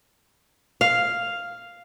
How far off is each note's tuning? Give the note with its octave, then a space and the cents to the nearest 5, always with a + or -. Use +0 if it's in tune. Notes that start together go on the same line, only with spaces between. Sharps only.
F5 +0